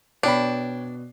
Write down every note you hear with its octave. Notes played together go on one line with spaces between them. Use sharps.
B2 B3 D4 C#5 G5 B5 C7